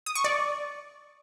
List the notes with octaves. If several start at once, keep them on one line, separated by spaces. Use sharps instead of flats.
D#6
C#6
D5